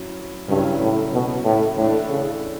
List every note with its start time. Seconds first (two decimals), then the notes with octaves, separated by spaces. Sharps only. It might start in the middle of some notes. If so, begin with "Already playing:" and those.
Already playing: F#3 C#4 E4
0.49 G2 C#3 F#3 C#4 E4
0.81 A2
1.13 B2
1.45 A2
1.77 A2 E3 A3 D4
2.09 C#3